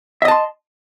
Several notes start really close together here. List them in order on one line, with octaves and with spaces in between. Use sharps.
E5 D#5 A5 C6